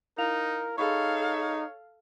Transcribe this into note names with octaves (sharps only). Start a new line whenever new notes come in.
D#4 E4 A#4 F5 F7
D#4 G#4 A4 C#5 F5 B5 C#6